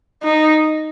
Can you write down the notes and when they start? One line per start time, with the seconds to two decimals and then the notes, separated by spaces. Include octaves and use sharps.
0.23 D#4